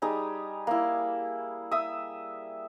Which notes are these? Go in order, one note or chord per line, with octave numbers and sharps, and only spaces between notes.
G3 D#4 G#4
A#3 E4
E5 D#6